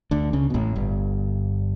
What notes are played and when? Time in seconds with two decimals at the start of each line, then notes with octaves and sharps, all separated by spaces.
0.11 D2 D3
0.33 C#2 C#3
0.50 B2
0.54 A1 A2
0.75 G1 G2